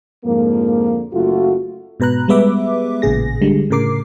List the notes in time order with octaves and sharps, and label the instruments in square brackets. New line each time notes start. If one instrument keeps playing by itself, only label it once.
[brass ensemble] F2 G#2 D3 F3 A#3
F#1 A3 F4 F#4
[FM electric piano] G#2 B2 B4 A#5 F#6
G3 G#3 B3 B4 E5 D6
A1 A#2 C#3 G#4 A#6
D3 G3 G#3
A2 C#3 A#4 D6 C7